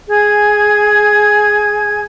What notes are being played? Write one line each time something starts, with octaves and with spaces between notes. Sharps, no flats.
G#4 G#5 G#6